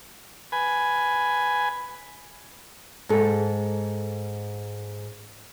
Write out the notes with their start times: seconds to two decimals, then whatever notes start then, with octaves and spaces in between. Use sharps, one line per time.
0.52 B4 G#5
3.09 G#2 A4